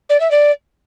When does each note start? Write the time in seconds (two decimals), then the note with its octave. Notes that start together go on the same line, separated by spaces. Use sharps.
0.09 D5
0.20 E5
0.31 D5